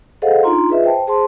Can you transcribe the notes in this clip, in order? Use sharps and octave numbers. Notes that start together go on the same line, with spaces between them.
G#4 A4 C5 D#5 F5 F#5
D4 D#4 F4 A#5 C6
F4 G#4 B4 D#5 E5
C5 G5 A5
G#4 C5 A5 C6